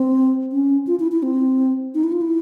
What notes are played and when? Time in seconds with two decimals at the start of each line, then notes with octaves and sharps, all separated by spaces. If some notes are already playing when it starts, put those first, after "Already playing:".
Already playing: C4
0.52 C#4
0.87 F4
1.00 E4
1.12 E4
1.23 C4
1.94 D#4
2.04 E4
2.12 F4
2.21 E4